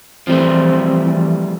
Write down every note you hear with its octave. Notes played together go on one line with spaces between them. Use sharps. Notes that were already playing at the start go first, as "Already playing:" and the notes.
E3 F3 G3 A3 C4